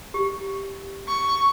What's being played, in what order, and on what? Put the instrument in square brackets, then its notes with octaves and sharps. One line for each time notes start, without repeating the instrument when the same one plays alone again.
[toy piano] G4
[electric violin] C#6